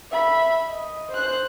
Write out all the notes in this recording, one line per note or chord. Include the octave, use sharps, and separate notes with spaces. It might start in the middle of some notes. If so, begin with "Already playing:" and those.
E5 B5
D#5
C5 F#6